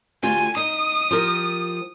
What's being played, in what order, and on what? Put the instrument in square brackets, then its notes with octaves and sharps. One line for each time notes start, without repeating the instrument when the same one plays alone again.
[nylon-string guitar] D2 F4 G4 [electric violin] G#5
[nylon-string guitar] D#4 [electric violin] D#6
[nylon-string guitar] F3 G4 A#4